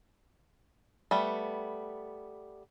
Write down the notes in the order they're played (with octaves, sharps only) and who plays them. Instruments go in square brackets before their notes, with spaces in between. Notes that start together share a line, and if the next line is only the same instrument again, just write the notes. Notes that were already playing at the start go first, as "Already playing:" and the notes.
[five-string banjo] G3 A3 B3